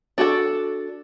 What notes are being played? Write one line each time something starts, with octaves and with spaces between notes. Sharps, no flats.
D4 F#4 A4